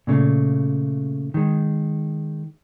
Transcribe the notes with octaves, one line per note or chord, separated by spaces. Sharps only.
A#2 C#3 A3
D#3 G#3